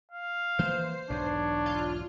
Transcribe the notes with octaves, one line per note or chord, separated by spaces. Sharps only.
F5
E3 F3 A#3 C5
B1 E2 G#2 D4 C#5
F4